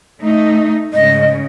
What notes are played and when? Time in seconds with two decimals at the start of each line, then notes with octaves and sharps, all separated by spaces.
0.19 A3 D#4
0.93 G#2 C#3 D#5